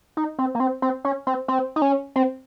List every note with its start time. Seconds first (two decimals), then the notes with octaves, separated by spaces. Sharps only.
0.17 D#4
0.39 C4
0.55 A#3
0.60 C4
0.82 C4
1.05 C#4
1.27 C4
1.48 C4
1.76 D#4
1.82 C#4
2.16 C4